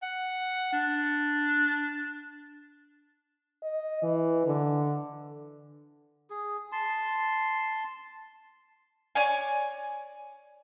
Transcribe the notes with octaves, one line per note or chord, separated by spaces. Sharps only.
F#5
D4
D#5
E3
D3
G#4
A5 C6
C#5 D5 G#5